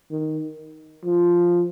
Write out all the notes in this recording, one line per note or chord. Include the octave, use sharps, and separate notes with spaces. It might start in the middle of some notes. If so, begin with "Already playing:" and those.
D#3
F3